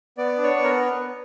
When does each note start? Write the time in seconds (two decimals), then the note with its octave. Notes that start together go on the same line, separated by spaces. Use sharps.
0.18 B3 D5
0.38 D4
0.43 C#5
0.56 B3
0.64 A#4